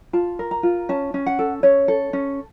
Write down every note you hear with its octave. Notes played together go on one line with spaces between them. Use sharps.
F4 A5
A#4
A#5
F4
C#4 A5
C#4
F#5
A4
C#4 C#5
A4
C#4